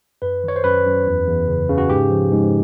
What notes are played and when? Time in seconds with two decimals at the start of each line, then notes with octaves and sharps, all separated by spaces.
0.22 F#2 B4
0.44 D#3 C#5
0.56 C5
0.64 F#2 B4
0.86 F#2
1.07 E2
1.27 E2
1.47 C#3
1.69 C#3
1.78 F#4
1.89 G#2 G4
2.11 F3
2.32 G#2